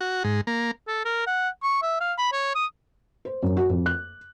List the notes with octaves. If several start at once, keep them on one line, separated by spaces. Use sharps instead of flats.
F#4
G#2
A#3
A4
A#4
F#5
C#6
E5
F5
B5
C#5
D#6
C5
F#2
F#4
F2
F#6